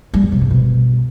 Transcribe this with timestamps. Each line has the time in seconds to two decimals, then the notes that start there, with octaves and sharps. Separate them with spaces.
0.14 G3
0.23 E2
0.32 C3
0.41 G2
0.51 B2